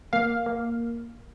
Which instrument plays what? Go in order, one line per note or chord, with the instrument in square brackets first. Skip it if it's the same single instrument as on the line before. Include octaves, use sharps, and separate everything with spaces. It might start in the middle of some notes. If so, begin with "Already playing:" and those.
[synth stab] A#3 F5
A#3